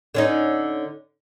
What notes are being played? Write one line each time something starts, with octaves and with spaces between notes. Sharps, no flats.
D3 C#4 D#4